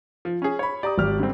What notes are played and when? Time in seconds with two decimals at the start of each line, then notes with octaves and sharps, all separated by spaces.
0.25 F3
0.42 C#4 G#4
0.59 C#5 B5
0.83 G4 D5 A#5 D#6
0.98 G#1 G4 F6
1.19 D3 G3 C4